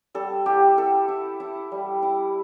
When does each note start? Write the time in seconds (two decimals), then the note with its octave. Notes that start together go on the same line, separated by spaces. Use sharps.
0.14 G3 A4
0.46 E4 G4
0.77 E4 A4
1.08 E4
1.40 E4
1.72 G3
2.02 E4